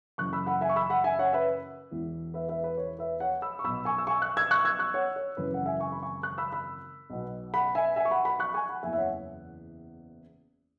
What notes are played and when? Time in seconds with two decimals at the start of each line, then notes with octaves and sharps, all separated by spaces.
0.18 F#1 F#2 C#3 E3 C#6 F#6
0.33 B5 E6
0.47 F#5 B5
0.61 E5 G#5
0.69 C#6
0.76 B5 E6
0.90 F#5 B5
1.04 E5 G#5
1.19 C#5 F#5
1.33 B4 E5
1.91 E1 E2 E3
2.34 B4 E5
2.49 B4 E5
2.64 B4
2.77 C#5
2.99 B4 E5
3.20 C#5 F#5
3.42 B5 E6
3.59 C#6
3.64 B1 B2 B5 E6
3.85 G#5 C#6
3.98 E6
4.07 G#5 C#6
4.22 C#6 F#6
4.37 E6 G#6
4.51 C#6 F#6
4.65 E6 G#6
4.79 C#6 F#6
4.94 C#5 F#5
5.16 C#5
5.37 G#1 F#2 C#3 E3 B4
5.54 F#5
5.66 E5 G#5
5.80 G#5 C#6
5.92 B5
6.03 G#5 C#6
6.23 C#6 F#6
6.38 B5 E6
6.53 B5 E6
7.10 B1 B2
7.54 F#5 B5
7.75 E5 G#5
7.96 E5 G#5
8.05 C#6
8.11 F#5 B5
8.25 F#5 B5
8.39 C#6 F#6
8.54 G#5 C#6
8.69 F#5 B5
8.83 F#1 E2 E3 E5 G#5
8.93 E5
8.98 C#5 F#5